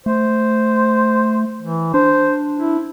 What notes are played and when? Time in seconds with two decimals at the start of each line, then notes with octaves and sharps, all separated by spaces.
0.06 A3 C5
1.62 E3
1.94 D4 C5
2.58 E4